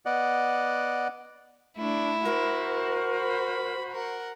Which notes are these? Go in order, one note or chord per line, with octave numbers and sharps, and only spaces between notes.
B3 D5 D#5 F#5
A3 D4 E4
F#4 A#4 C5
B5
A#4 F#5